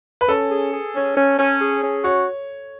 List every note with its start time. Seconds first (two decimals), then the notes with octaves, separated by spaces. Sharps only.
0.21 B4
0.28 C#4 A4
0.51 G#4
0.73 G#4
0.95 C#4
1.17 C#4
1.39 C#4
1.61 G#4
1.83 C#4
2.04 F#4 C#5